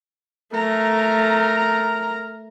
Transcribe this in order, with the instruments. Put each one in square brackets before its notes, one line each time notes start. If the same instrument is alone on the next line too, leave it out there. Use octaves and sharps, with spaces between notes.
[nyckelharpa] A3 [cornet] A#4 [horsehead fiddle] A#5